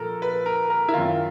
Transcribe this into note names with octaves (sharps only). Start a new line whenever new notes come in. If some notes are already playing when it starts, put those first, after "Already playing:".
Already playing: A#2 F3 A4 A#4
B4
A#4
A#4
E4
F#2 D#3 F4